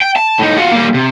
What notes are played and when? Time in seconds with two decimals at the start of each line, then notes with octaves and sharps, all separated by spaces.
0.02 G5
0.16 A5
0.39 A2 D#4
0.57 F4 F#4
0.72 G3 A#3
0.94 C3